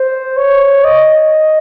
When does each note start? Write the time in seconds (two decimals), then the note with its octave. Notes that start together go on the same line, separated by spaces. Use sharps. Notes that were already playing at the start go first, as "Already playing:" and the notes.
Already playing: C5
0.37 C#5
0.84 D#5